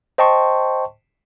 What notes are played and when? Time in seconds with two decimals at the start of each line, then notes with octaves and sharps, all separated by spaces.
0.18 C5 D#5 G5 A5 C6 C#6